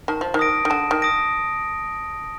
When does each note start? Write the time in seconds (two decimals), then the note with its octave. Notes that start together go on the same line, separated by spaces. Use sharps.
0.08 D#3 A5
0.21 F3
0.34 D#3
0.39 D#6 A#6 D7
0.65 D#3
0.70 D3 A5
0.91 D#3
1.02 D#6 A#6 D7